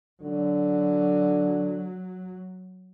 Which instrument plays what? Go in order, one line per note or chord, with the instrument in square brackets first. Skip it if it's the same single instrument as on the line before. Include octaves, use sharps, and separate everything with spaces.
[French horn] D3 [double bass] F#3